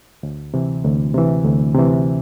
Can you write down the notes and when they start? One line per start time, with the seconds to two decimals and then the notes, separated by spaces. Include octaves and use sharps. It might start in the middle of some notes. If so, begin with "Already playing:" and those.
0.23 D2
0.54 C3 E3
0.84 D2
1.14 C3 E3
1.45 D2
1.75 C3 E3